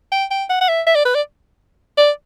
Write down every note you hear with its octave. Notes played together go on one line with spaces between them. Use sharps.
G5
G5
F#5
F#5
E5
E5
D5
B4
D5
D5